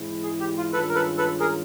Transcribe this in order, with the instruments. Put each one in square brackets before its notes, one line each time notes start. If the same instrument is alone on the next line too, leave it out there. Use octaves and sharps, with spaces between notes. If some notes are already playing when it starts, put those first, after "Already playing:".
Already playing: [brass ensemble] G#2 E3 G#3 C4 E4
[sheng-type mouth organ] G#4
G4
F4
[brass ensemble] G2 D#3 G#3 C#4 F4 [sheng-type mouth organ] A4 B4
[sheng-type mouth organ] A#4
A4 B4
A4 B4
G#4 A#4